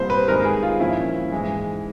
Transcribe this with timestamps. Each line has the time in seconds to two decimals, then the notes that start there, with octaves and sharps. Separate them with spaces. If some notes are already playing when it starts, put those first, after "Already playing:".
Already playing: C2 A#2 G3 C5
0.10 B4
0.28 G2 D#3 G#3 C4 D#4 A#4
0.45 G#4
0.63 F4
0.80 A#2 F3 A#3 C#4 E4
1.32 G#2 E3 G#3